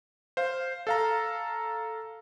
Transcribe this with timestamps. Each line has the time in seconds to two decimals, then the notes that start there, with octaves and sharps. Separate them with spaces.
0.37 C5 F5
0.87 A4 F5 A#5